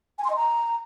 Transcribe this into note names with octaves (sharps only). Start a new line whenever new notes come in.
G#5
C6
D#5
A#5